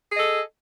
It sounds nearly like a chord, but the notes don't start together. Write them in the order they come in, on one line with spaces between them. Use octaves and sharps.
G#4 D#5 A4